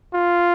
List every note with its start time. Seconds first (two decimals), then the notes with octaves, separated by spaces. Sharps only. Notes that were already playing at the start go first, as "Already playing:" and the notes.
0.14 F4